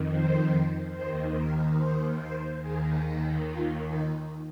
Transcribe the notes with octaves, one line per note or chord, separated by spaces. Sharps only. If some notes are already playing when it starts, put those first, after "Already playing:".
Already playing: F2 D#3
C5
D#2 D#3 C5
A#4
C5
C5
D#2 D#3 G#4
D#4
F4
D#4